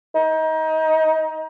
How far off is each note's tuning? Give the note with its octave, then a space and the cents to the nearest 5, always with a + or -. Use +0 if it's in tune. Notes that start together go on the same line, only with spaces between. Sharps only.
D#4 +25